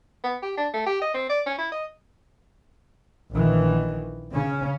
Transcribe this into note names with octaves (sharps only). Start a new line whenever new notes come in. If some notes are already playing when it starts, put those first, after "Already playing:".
B3
G4
D4
A3
G4
D#5
C4
D5
C#4
E4
D#5
A#1 D#3 E3
C#3 C#4